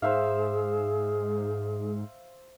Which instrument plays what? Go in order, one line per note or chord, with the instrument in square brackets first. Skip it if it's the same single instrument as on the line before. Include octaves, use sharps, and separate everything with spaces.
[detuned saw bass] G#2 [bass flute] G#4 [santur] C5 E5 F5